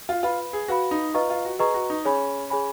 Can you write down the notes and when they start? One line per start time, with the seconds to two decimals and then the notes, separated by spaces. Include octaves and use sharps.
0.09 F4
0.23 F4 B4 F5 B5
0.53 G#4
0.68 F#4 B4 F5 B5
0.91 D#4
1.14 F4 B4 D#5 A#5 C#6
1.30 F4
1.45 F#4
1.59 G#4 B4 D#5 A#5 C#6
1.74 F#4
1.90 D#4
2.04 C#4 G#4 C#5 G#5 B5
2.50 G#4 C#5 G#5 B5